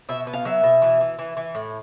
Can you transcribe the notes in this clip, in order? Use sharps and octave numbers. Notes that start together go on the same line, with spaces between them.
B2 E5
B3
F5
F#3 E5
B2
E3
E3
E3
E3
A2